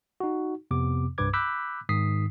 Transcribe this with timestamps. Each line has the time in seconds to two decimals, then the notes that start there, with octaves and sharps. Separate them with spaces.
0.20 D#4 F#4
0.71 F2 C3 B3 D6
1.18 C2 G2 B4 D6 G#6
1.33 B5 D6 E6 F#6 G6 B6
1.89 G#2 D#3 D#6 B6 C7